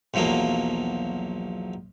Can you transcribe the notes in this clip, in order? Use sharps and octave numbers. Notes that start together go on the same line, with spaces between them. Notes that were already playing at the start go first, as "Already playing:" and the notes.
B1 E2 F3 F#3 A#3